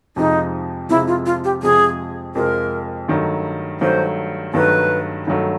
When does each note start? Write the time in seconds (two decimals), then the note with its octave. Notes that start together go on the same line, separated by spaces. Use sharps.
0.16 F2 C3 F3 G#3 D#4
0.89 F2 C3 F3 G#3 E4
1.07 F4
1.26 F4
1.44 G4
1.63 F2 C3 F3 G#3 G#4
2.35 F2 C3 F3 G#3 A#4
3.08 G2 D#3 F#3 A3
3.81 G2 D#3 F#3 A3 C5
4.54 G2 D#3 F#3 A3 B4
5.27 G2 D#3 F#3 A3